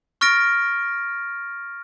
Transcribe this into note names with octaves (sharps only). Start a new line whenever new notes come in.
C#6 F6 A6 A#6 D7